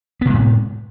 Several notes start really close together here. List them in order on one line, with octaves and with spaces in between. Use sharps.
B3 C3 G#3 A2